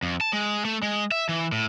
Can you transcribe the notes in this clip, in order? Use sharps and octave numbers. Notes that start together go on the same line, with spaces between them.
F2
A5
G#3
A3
G#3
E5
E3
A2